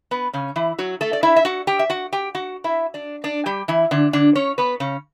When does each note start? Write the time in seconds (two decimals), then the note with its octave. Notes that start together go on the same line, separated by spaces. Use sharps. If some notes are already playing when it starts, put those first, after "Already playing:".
0.11 B3 B4
0.33 C#3 C#4
0.56 E3 E4
0.78 F#3 F#4
1.01 A3 A4
1.13 D5
1.23 E4 E5
1.36 E5
1.45 F#4 F#5
1.67 G4 G5
1.79 E5
1.90 F#4 F#5
2.13 G4 G5
2.35 F#4 F#5
2.64 E4 E5
2.94 D4 D5
3.24 D4 D5
3.46 G3 G4
3.68 E3 E4
3.91 D3 D4
4.13 D3 D4
4.35 C#4 C#5
4.58 B3 B4
4.80 C#3 C#4